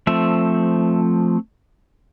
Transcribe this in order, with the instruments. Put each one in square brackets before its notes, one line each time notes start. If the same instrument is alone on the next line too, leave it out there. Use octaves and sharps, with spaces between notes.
[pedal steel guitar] F3 A3 C4 E5